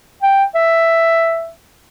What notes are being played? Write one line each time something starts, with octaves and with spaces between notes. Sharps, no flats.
G5
E5